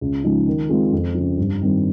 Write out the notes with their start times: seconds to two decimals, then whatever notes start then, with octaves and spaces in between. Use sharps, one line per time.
0.01 C#2
0.24 C#3 F3 G#3 D#4
0.47 D#3
0.69 G#3 C4 F4 G#4
0.92 F2
1.15 C#3 F3
1.38 G2
1.61 D#3 G3 C4